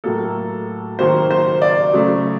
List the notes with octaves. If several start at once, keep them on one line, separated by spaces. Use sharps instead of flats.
A2 F#3 A#3 A4
D#3 F#3 A#3 C5
C5
D5
C#3 F#3 A3